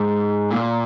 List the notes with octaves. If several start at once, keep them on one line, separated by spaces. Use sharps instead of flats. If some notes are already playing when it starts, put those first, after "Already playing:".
Already playing: G#2
A#2